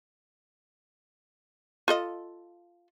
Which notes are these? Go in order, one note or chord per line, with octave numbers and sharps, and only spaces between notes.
F4 A4 D#5